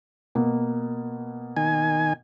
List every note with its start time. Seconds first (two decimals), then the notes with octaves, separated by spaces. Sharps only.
0.35 B2 A#3
1.57 D#3 G#5